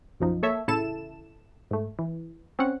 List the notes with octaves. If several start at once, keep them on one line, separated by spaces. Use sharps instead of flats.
B1 F#2 F3 D#4
A#3 A4 C#5 E5
A1 C#3 E4 A4 A5 E7
G#2 A3
E3
C4 C#4 F#5